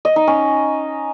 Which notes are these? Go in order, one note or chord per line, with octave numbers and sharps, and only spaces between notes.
D#5
D#4
C#4